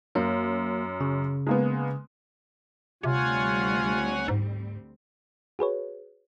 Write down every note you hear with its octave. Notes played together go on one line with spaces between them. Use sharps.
F#2 A#3
C#3
G#3 A#3 B3
D2 C3 G3 C4 F4 C#5 F#5 G#5
G#2
F#4 G#4 B4 C#5